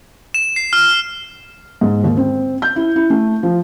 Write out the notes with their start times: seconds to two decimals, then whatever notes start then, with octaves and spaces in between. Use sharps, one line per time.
0.34 E7
0.56 C7
0.73 F6
1.81 G#2
2.04 D#2
2.17 C4
2.62 G6
2.76 E4
2.96 E4
3.10 A3
3.43 F3